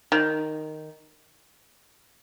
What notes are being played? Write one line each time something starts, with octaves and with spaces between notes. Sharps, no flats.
D#3